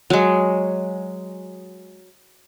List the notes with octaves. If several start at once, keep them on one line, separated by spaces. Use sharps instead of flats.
F#3 G#3